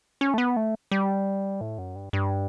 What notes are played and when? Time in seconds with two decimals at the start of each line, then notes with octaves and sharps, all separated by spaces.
0.21 C#4
0.34 A3
0.38 B3
0.56 A3
0.91 G3
1.61 A2
1.78 F#2
1.96 G2
2.13 G2